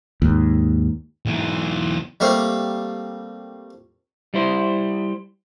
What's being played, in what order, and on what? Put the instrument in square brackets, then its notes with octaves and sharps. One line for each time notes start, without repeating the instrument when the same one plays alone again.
[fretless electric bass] D#2 G#2
[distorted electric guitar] B1 E3
[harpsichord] G3 A3 A#3 C4
[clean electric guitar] G3 E4 C5